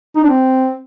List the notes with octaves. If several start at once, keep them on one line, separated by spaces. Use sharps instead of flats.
D#4
D4
C4